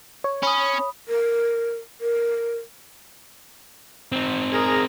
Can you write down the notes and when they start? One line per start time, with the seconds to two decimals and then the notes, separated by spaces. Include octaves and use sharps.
0.24 C#5
0.43 C#4 B5 D#6
1.08 A#4
2.01 A#4
4.12 C4 D#4
4.53 G#4 A#4 A#5